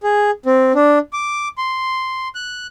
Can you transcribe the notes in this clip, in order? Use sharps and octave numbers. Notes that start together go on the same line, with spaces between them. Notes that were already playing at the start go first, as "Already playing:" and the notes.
G#4
C4
D4
D6
C6
F#6